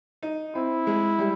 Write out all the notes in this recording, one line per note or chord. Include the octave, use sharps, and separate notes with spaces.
D#4
C4 E4
G#3
G3